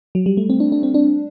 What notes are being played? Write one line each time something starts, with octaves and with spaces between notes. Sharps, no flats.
F#3
G3
A3
C4
D4
D4
C4
D4